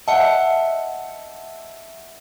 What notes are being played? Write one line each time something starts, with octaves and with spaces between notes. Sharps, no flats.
D#5 E5 F#5 A5